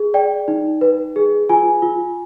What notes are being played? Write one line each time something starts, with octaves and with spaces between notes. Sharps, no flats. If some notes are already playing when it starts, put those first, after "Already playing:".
Already playing: G#4
D5 G5
D#4
B4
G#4
F4 G#5
F4